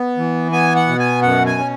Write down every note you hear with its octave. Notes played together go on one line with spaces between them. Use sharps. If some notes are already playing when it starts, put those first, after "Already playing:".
Already playing: B3
E3
B3 G#5
F#5
B2
G#5
F#2 F#5
G#5
C#4